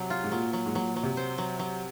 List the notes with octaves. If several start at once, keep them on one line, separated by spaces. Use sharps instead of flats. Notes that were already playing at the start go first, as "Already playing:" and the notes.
Already playing: C3 F#3
F4
G#2
A#2 F#3
F#3
G#2
A#2 F#3
A#2
F#3
C3
C5
F#3
F#3